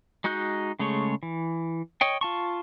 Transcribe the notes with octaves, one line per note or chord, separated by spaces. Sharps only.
G#3 D#4 F#4 F#6 G6
C#3 G#3 A3 C#5
E3
C#5 D#5 G5
F4 A5 C#6